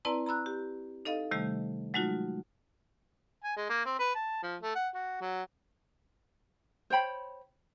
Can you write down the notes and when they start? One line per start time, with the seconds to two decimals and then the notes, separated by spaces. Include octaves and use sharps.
0.05 C4 E4 B4 D5 A5 A#5
0.26 A#5 B5 E6 F#6
0.46 G4
1.05 D#4 A4 D#5 F5
1.31 C3 D#3 G3 A3
1.94 F#3 G#3 A3 D#4 F4 F#4
3.44 G#5
3.56 G#3
3.69 A#3
3.85 C4
3.99 B4
4.15 A5
4.43 F3
4.62 A3
4.75 F#5
4.94 F#4
5.21 F#3
6.90 C5 C#5 G5 B5